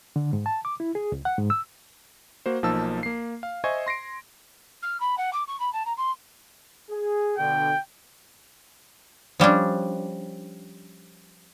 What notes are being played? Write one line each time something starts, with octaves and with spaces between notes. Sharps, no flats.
D3
G#2
A5
D6
E4
G#4
C#2
F#5
G#2
E6
A#3 F#4 C5
B1 F3 A#3 D#4 A5 E6
A#3 C7
F5
C5 D#5 E5 G#5 C#6 G#6
C6 A#6 C7 D7
F6
B5
F#5
D6
C#6
B5
A5
A#5
C6
G#4
B2 D3 G5
F3 G3 C#4 D4